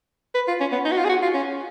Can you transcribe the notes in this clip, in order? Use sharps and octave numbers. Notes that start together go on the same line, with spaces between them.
B4
F4
C#4
B3
D#4
F#4
F4
G#4
F#4
F4
C#4